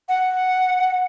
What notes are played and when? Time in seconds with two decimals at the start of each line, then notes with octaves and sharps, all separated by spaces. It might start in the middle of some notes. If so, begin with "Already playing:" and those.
0.09 F#5